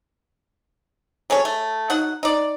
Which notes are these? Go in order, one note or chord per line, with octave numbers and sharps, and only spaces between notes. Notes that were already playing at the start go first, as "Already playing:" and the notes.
F#3 G#4 A4 C#5
A3
F#3 D#4 F#5
D#4 D5